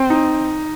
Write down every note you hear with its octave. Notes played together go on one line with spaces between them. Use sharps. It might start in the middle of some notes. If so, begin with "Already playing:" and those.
Already playing: C4
D#4